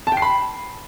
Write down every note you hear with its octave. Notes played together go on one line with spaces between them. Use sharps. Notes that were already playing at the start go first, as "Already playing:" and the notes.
A5
G5
C7
B5